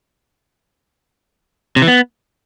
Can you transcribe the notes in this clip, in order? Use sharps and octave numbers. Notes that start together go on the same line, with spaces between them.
C3
E3
B3